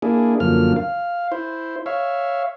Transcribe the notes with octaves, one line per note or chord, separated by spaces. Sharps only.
A#3 D4 E4 G#4
F#2 D3 F3 A#3 F6
F5
E4 C5
C#5 E5 F5